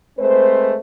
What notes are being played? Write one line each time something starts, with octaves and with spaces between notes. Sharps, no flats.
G#3 A3 C4 B4 C5